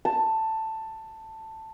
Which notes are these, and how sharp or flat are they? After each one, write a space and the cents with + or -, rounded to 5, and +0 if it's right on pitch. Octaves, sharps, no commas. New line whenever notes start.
A5 +10